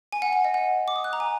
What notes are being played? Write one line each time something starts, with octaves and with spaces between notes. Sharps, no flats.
G#5
F#5
F#5
D#5
F#5
D6
D#6
F#6
A#5
G#5